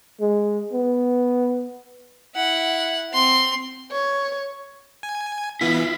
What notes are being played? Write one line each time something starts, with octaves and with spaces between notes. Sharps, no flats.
G#3
B3
E4 F#5
C4 C6
C#5
G#5
E3 B3 E4 F4 B6